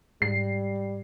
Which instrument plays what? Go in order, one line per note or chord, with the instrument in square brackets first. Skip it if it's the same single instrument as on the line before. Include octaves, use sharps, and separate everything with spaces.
[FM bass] G#2 [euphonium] G3 [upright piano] C7